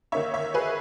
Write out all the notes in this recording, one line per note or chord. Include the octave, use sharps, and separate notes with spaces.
D#3 A#3 D#4 C#5 E5
C#5 E5
G#4 B4